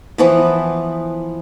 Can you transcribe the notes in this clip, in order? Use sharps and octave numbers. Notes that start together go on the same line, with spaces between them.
E3 F3 B3